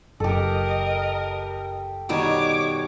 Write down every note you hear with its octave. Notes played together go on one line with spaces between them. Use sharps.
F#1 G4 A4 A#4 D#5
B2 D#3 G3 C#5 D6